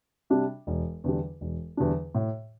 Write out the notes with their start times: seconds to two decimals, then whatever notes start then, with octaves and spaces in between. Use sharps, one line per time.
0.30 C3 G3 D4
0.67 E1
1.04 E2 D3 G3 D4
1.41 E1
1.77 E2 D3 G3 D4
2.15 A2